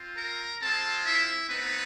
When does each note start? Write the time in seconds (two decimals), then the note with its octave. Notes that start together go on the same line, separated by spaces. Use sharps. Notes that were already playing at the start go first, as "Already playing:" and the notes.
Already playing: C4 F4
0.17 A#4 A#5
0.61 G#3 C4 F4 A4 A5
1.05 E4 E5
1.49 A3 B3 C4 D#4 B4